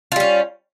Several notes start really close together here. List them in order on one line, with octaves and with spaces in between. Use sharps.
F4 G3 C#4